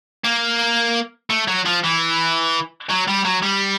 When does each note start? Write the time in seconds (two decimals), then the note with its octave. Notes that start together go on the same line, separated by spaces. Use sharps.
0.25 A#3
1.30 A3
1.48 F#3
1.66 F3
1.84 E3
2.90 F#3
3.08 G3
3.25 F#3
3.42 G3